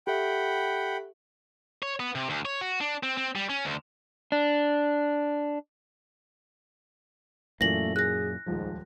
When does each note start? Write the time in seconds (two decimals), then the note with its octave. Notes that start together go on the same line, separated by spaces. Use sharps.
0.07 G4 A4 E5 F#5 G5 B5
1.82 C#5
2.00 B3
2.15 C3
2.30 D2
2.45 C#5
2.61 F#4
2.81 D4
3.03 C4
3.17 C4
3.36 G3
3.50 C#4
3.65 D2
4.32 D4
7.61 F#2 A#2 E3 A3 A#6 F#7
7.96 G#4 F#6 A#6
8.46 D#1 C#2 G#2 F3